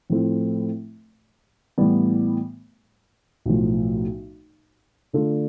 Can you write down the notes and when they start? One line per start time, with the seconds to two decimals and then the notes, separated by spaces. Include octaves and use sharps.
0.10 A2 F3 A3 C4 E4
1.78 A2 E3 G3 B3
3.46 B1 A2 F3
5.13 D3 A3 D4 F4 A4